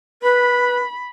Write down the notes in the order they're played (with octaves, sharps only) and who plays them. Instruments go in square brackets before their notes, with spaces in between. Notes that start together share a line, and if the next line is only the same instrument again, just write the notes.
[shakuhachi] B4 [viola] B5